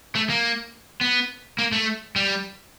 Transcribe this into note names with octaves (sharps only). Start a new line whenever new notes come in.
A3
A#3
B3
A#3
A3
G3